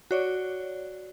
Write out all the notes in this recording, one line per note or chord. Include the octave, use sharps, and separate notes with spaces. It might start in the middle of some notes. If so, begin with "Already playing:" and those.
F#4 C#5 D5